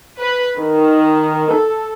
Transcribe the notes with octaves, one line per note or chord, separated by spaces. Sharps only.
B4
D#3
A4